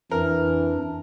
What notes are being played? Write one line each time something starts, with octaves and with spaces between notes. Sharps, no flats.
F2 E3 D4 A#4